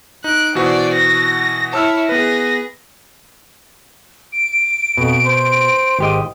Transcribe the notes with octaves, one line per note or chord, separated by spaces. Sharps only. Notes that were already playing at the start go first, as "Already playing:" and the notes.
D#4 F#6 D7
B2 E3 F#4 C5 D5
A#6
E4 C#5 A5 E6 F6
B3 G#4 B4 A#6
D7
F2 B2
C5
G#1 G4 D#5